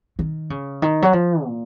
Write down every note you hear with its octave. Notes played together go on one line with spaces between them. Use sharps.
D#3
C#3
D#3
F#3
F3
A#2